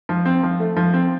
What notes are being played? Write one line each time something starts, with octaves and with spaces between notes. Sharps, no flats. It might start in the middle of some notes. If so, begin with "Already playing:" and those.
F3
C4
F3
A3
F3
C4